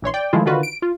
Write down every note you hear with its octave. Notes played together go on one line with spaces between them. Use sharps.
A#1 E3 C#5 C6
D5 G5
D#3 F3 G#3 A3 E4 F4
D3 D#3 F4 F#4 B4
D7
F4